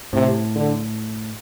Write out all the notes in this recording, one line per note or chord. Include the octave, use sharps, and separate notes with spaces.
A2 C3
D3